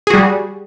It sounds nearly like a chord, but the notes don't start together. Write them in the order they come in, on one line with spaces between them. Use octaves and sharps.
G#4 F#4 G3